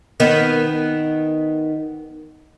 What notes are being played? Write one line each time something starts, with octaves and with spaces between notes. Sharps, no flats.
D#3 B3